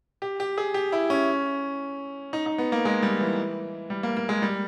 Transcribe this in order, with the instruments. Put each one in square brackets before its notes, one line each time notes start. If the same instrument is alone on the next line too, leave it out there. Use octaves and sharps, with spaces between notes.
[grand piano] G4
G4
G#4
G4
E4
C#4
D#4
D#4
B3
A#3
G#3
G3
E3
G3
A#3
A#3
G#3
G3